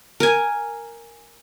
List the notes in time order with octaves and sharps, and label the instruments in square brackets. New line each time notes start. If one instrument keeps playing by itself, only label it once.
[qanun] A#4 G#5